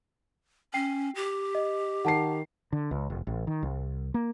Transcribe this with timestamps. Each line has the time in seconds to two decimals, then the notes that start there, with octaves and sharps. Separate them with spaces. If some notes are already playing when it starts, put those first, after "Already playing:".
0.74 C#4 G5 C7
1.15 G4
1.55 D#5
2.05 D#3 F#5 A5 C7
2.72 D3
2.91 C#2
3.10 F1
3.27 A1
3.47 D#3
3.63 C2
4.14 A#3